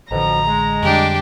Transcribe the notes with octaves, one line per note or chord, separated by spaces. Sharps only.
A1 F2 B2 D3 F3 A#5
G#3
F2 D3 G3 D4 G4